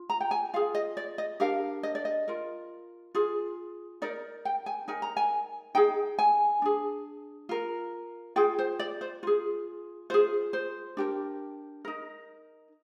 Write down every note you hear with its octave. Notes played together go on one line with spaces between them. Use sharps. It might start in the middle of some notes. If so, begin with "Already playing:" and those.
Already playing: F4
A#5
G5
G#5
F4 G#4 F5
D#5
D5
D#5
D4 G4 A#4 F5
D#5
D5
D#5
F4 A#4
F4 G#4
D#4 A#4 D5
G5
G#5
D#4 A#4 G#5
A#5
G#5
D#4 G#4 G5
G#5
D4 G#4
F4 A#4
F4 G#4 G5
C5
D5
C5
F4 G#4
F4 G#4 C5
C5
D4 G4 A#4
D#4 A#4